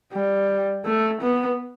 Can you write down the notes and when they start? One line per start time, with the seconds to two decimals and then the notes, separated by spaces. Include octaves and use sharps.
0.14 G3
0.85 A3
1.21 B3